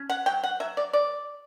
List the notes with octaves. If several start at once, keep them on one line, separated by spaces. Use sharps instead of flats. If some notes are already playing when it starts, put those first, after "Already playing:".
Already playing: C#4
F#5
F#3 G5
F#5
F#3 E5
D5
D5